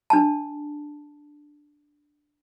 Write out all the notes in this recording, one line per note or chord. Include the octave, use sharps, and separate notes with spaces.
D4 A5